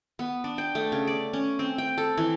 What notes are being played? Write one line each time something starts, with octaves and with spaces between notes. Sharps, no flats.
B3
D4
G5
A3
C#3
D5
C#4
C4
G5
A4
E3